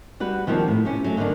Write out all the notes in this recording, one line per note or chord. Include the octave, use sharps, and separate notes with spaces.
G3 F#4 B4
D#3 F3 G3 A#3 C4
A2
C3 C#4
F#3 A3
D3 D#3 G#3 A#3 D4